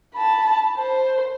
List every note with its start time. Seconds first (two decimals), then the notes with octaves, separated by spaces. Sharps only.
0.15 A5 B5
0.77 C5